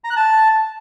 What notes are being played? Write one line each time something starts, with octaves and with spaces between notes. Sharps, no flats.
A#5
F#6
A5